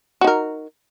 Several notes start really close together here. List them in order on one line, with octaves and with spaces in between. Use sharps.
F#4 D#4 A#4